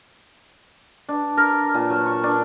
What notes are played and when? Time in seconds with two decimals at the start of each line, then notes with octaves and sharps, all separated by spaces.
1.09 D4
1.37 A#4
1.74 A#2
1.90 F#3
2.06 C#6
2.24 D4